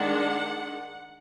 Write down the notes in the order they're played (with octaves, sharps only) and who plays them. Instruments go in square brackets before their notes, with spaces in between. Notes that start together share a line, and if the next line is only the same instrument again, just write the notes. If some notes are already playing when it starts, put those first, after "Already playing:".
Already playing: [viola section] D#3 G#3 D4 F#5